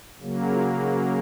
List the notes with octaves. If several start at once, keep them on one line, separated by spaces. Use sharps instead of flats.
C#3 F#3 A#3
F4
D#4